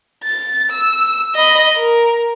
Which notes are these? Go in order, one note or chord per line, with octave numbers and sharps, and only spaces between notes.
A6
E6
D#5 B5
A#4